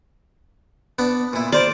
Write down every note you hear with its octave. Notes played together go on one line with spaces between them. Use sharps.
B3 D4
A#2 E4
A#4 C5 D5 A5